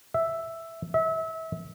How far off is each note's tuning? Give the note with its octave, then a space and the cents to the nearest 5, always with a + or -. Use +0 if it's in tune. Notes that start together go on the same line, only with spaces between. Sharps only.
E5 +0
E5 -30